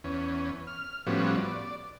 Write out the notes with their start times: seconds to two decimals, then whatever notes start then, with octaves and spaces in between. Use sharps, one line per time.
0.04 E2 C#4
0.67 F6
1.06 A2 F3 G3 B3 C#4 F#4
1.37 D5